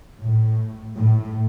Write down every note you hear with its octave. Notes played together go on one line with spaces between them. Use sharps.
A2
A2